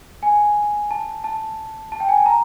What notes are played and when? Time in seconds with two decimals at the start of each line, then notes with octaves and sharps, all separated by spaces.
0.23 G#5
0.91 A5
1.24 A5
1.92 A5
2.00 G5
2.09 G#5
2.17 A5
2.26 A#5